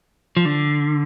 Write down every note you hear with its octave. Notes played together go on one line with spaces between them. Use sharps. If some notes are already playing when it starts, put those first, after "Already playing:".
F3
D3